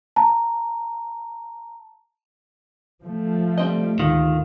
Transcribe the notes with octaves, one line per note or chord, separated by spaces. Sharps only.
A5 A#5
F3 A3
G3 C4 D#5
D2 G#2 D#3 F4